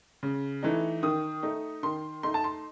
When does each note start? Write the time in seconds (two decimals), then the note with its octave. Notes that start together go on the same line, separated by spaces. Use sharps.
0.23 C#3
0.63 E3 A3 D#4
1.03 D#3 D#6
1.43 A3 D#4
1.83 D#3 C6
2.23 A3 D#4 C6
2.34 A5
2.44 C6